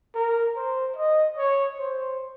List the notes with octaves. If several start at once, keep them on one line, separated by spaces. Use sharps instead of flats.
A#4
C5
D#5
C#5
C5